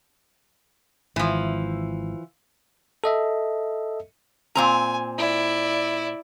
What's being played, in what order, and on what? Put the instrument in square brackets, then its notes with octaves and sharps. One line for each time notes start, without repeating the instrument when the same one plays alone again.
[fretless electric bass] G#1 [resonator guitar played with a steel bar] E3 F3
[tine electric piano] A4 D#5 E5
[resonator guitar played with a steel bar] A#2 C4 A#5 [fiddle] G#5
[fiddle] E4 D5